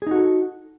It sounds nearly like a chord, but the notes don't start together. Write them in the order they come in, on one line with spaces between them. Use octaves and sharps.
G#4 D#4 F#4 A4